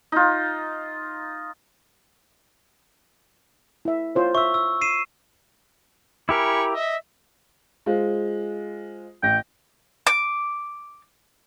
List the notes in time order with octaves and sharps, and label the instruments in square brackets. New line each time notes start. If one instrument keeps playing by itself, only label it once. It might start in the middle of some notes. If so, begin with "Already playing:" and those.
[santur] D#4 F4
[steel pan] E4 E5
F4 C5 C#5
[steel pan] E5 [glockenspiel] C#6 E6
[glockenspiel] E6
C7 D#7 E7
[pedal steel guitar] E4 G4 A#4 [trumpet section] G#5 B5 C#6
[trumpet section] D#5 E5
[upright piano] G#3 F4 C5
[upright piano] A1 A#6 [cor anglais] G5
[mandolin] D6